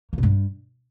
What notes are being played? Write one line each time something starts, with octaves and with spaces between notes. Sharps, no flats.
A#3
B2
G2